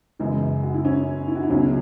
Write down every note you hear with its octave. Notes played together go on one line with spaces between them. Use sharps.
F#2 C#3 E3 G#3 E4
F#4
E4
C#4
E4
F#4
E4
C#2 B2 F#3 C#4